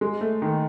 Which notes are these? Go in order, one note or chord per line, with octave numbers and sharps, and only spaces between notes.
G#3
A3
D#3